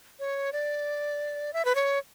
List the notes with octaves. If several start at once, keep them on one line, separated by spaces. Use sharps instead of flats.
C#5
D5
E5
B4
C#5